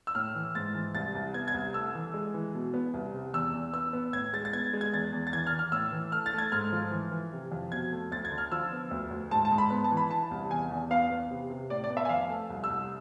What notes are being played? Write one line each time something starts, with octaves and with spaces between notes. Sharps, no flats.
E6
A2 F6
E3
G#2 A6
E3
C2 A6
C2
B3 G#6
G#6
C2
A3 E6
E3
G#3
E3
B2
B3
C2
C3
E2 E6
E2
B3 E6
B3
A2 G#6
G#3 A6
A6
B3 G#6
G#3
G#6
E2 A6
E2
A6
E3 G#6
F6
E3
F6
A2 E6
E3
A3 F6
A6
A3
G#6
G#2 F6
F3
E3
E3
C3
F2
B2 G#6
A3
D2 A6
G#6
D3
F6
F3 E6
B3
D2
D2
G#2 A5
A5
G#2
B5
B3
A5
E3
B5
E3 A5
C2
E2 G#5
E2
B3 F5
B3
C3
C3
A2 D5
D5
B3
E5
G#5
F2 F5
A3
C2
E6
C2